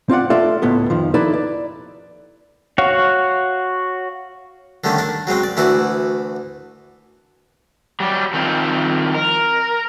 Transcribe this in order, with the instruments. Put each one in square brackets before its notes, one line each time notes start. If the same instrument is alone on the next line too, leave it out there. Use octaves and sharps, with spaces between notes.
[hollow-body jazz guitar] C4 F4 D5 F#5
A3 F4 A4 D5 E5
C#2 A2 B3 A4
F2 D#3 F3
D#4 E4 A4 B4 D5 A5
D5
[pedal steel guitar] F#4 C#5 F5 F#5
[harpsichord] D3 D#3 G3 A3 C#4
D4 A#4
F#3 G#3 C4 C#4
D5
D2 E3 E4 F#4 A#4 D5
[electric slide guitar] F#3 G3
D#3 F3 C4
A#4